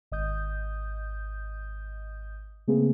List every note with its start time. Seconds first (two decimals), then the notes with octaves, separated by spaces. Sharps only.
0.11 G#1 D#5 D#6 G6
2.68 C#3 A3 A#3 C4 G#4 B4